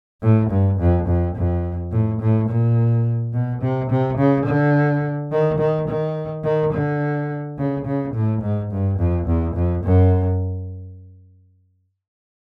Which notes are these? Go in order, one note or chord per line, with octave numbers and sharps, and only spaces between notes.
A2
G2
F2
F2
F2
A2
A2
A#2
B2
C3
C3
C#3
D3
D#3
D#3
D#3
D#3
D3
C#3
C#3
A2
G#2
G2
F2
E2
F2
F#2